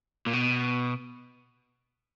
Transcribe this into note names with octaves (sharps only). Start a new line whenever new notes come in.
A#2
B2